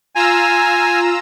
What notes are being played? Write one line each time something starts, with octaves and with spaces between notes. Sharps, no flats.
F4 G#5 A#5 E6